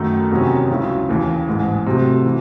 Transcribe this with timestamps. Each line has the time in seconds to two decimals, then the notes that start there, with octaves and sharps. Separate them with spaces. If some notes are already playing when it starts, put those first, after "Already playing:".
Already playing: F#2 D#3 A3
0.31 E2 C3 D#3 F#3 C#4
0.70 C#2 C#3 F#3 C#4 E4
1.09 D#2 C#3 E3
1.48 A1 G#2 E3 G#3
1.86 C3 F#3 A3
2.25 E3